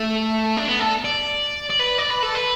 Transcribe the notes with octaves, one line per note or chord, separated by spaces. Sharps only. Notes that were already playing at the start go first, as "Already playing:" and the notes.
Already playing: A3
D4
B3
A4
D5
D5
B4
D5
B4
A4
B4